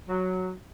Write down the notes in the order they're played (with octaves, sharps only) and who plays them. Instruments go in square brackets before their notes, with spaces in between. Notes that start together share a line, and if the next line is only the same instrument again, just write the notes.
[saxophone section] F#3